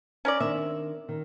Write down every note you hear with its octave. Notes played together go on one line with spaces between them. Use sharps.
C#4 A#4 D5
D#3 C4 D4 E5
D#3